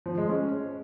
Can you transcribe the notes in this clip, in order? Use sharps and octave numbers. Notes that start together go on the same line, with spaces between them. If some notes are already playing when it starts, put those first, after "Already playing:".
F3
G#3
C#4